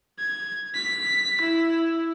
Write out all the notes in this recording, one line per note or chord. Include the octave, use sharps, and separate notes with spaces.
G#6
B6
E4